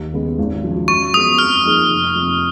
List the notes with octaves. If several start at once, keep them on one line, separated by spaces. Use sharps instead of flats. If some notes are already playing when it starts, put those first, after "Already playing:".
Already playing: D#2
C#3 G#3 B3
G#1
F#2 C#3 F3
F#2 C#6
F3 G#3 B3 D#6
F2 F6
F3 A#3 D#4 G#4
F1
F2 F3